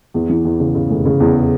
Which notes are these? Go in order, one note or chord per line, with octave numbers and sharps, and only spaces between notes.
E2
E3
E2
C#3
C#3
F1
C#3
E2